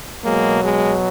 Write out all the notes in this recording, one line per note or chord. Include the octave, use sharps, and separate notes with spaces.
B2 F#3 G#3 A#3
G#3